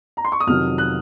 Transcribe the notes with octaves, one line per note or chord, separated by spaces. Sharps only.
A#5
C6
C#6
D#6
F2 C3 D#3 F#3 F6
F#6